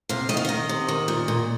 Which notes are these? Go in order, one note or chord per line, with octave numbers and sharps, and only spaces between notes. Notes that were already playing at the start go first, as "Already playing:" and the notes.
C3 F5
D#3 D#5
F5
D#3 D#5
C3
D#3
A#2
A#2